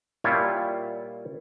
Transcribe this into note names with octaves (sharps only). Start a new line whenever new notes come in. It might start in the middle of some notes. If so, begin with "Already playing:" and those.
A#2 G3 E4 F4 C#5 A5